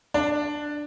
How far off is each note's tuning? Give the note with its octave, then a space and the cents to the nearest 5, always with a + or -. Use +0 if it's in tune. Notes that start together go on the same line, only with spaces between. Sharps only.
D4 +5